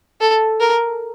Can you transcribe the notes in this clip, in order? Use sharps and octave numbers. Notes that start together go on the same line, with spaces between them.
A4
A#4